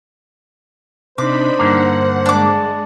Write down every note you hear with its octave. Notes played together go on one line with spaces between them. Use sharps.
C3 D4 D#4 C5 B5 D6
G2 D3 A#3 F#5
G#3 D4 D6